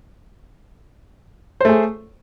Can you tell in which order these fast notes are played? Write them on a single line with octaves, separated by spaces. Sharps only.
C5 A3 G#4